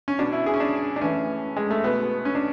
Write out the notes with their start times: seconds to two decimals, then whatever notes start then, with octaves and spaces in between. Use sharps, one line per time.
0.08 C#4
0.19 B2 D4
0.33 E4
0.46 G#4
0.54 C#4
0.60 D4
0.96 D4
1.01 A2 E3 C#4
1.56 G#3
1.71 A3
1.84 B2 B3
2.25 C#4
2.35 D4